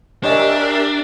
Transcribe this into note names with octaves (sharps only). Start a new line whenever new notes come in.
D4 G4 A#4 C#5 D#5 E5 G#5